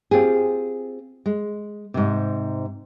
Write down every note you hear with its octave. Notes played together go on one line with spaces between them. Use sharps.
C4 F4 G4 G#4
G#3
G#2 C3